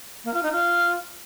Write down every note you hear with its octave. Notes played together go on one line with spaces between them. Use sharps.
A#3
F4
D#4
F4